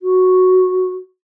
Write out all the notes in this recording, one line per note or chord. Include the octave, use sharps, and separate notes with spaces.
F#4